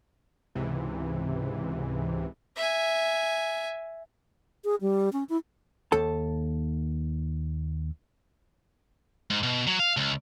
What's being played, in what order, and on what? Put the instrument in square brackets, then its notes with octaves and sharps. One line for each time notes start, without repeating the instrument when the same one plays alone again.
[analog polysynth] C#2 G#2 C3 E3
[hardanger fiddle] E5 G#5
[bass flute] G#4
G3
C#4
E4
[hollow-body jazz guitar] D#2 A4 A5
[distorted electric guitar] G#2
B2
F#3
F5
C#2